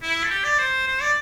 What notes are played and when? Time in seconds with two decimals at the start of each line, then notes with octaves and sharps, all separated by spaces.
0.02 E4
0.24 A4
0.30 G4
0.44 D5
0.58 C5
0.87 C5
1.01 D5